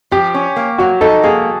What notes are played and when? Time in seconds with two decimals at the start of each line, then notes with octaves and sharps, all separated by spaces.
0.11 F3 G4
0.34 C#4
0.56 A#3
0.78 F#3 F#4
1.01 D#4 A4
1.23 A#3 G#4